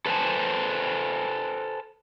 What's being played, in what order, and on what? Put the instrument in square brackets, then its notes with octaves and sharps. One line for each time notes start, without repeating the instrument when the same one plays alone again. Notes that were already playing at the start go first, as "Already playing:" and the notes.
[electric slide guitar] A4 B4 C5 G#5 A5